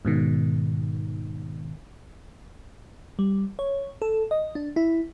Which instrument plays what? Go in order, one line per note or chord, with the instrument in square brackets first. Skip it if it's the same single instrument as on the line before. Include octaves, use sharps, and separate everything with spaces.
[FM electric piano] G#2 B2 D#3
G3
C#5
A4
D#5
D4
E4